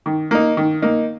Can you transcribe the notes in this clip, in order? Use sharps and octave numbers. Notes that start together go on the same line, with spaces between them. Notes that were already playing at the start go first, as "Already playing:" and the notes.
D#3
A#3 D#4
D#3
A#3 D#4